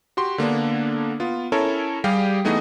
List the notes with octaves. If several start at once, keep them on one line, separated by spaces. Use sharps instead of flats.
F#4 G4 C6
D3 A#3 B3 D4
B3 F4
C#4 E4 A4 A#4 C#5
G3 G4 G#4 F5 G5
E3 A3 B3 D#4 G#4 D#5